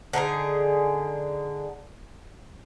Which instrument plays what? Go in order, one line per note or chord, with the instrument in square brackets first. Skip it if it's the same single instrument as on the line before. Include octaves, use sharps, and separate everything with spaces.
[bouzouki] D3 D#4 E4 G#4